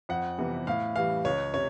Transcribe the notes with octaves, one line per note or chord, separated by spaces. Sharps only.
F2 F#5
C3 E3 G3 B3
A2 F5
E3 G3 F5
C#2 C#5
C3 C#5